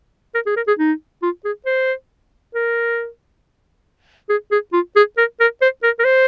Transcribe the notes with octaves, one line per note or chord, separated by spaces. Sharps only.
A#4
G#4
A#4
G#4
D#4
F4
G#4
C5
A#4
G#4
G#4
F4
G#4
A#4
A#4
C5
A#4
A#4
C5